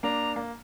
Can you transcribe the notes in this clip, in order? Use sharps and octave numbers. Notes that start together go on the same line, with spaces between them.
A#3 D4 A#5
A#3